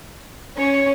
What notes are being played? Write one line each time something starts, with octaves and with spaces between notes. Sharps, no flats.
C#4 C#5